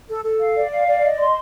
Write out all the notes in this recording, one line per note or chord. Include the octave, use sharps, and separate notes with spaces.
A4
A4
F5
D5
F5
D5
D#5
C6